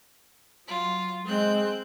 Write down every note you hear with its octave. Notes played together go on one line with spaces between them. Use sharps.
F#3 F4
G#3 C4 F#6 G6